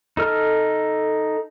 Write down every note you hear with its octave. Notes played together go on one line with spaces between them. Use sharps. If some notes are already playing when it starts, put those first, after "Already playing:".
D#4 A4 F6